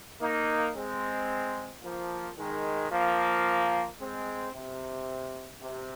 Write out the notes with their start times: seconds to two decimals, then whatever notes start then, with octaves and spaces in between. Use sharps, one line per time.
0.21 A#3 D#4
0.75 G#3 C4
1.83 F3 A#3
2.38 D#3 G#3
2.91 F3 A#3
3.99 G#3 C4
4.53 C3
5.61 C3